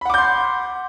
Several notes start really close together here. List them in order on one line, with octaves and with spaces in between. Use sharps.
B5 F#5 D6 G6 C6